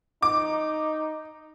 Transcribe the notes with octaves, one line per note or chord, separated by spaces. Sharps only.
D#4 D6